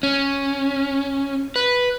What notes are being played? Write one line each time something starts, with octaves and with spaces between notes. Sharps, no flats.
C#4
B4